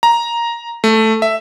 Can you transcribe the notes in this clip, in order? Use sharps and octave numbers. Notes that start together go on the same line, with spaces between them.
A#5
A3
E5